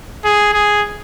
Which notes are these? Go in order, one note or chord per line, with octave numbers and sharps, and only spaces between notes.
G#4
G#4